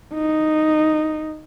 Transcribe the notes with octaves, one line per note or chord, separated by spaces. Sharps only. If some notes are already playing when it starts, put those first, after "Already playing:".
D#4